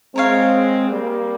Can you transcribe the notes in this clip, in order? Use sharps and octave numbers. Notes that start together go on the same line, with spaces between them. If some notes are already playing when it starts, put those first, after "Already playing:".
G#3 C4 A#4 C#5 F5
G3 A#3